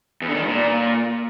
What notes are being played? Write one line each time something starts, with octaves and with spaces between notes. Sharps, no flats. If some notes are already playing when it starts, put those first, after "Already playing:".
E2
D3
D#3
G2
A#2